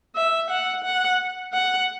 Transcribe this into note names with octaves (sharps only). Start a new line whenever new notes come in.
E5
F#5
F#5
F#5